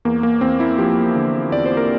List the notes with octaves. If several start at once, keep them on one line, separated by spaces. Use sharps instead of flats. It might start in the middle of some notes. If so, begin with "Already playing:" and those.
E2 A#3
A#3
E2 C4
E4
F3 G4
D3
E2 D5
C5
A#4